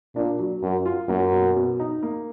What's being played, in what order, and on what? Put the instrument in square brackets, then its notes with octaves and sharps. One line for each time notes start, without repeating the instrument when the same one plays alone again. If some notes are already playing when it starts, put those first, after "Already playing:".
[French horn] A#2 [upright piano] D4
[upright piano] F#3
[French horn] F#2 [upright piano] F#3
[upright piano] F4
[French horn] F#2 [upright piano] A#3
[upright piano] B2
B2
D#4
A#3